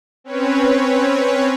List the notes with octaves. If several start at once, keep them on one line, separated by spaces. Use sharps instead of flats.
C4 C#4 B4 C#5